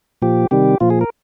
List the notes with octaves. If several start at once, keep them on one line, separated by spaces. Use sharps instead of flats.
A#2 F3 G4
C3 D#3 G3 G4
A#2 F3 F4
G#4
A#4